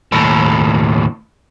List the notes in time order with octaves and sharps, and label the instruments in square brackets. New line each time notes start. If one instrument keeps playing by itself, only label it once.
[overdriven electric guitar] D#2 A2